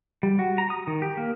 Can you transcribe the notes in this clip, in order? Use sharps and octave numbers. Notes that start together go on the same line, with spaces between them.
G3
F#4
A#5
D#6
D#3
G4
A#3